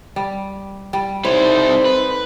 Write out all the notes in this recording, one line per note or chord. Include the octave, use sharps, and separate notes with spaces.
G3
G3
G3 C4 D#4 E4 A4 C5 C#5
B4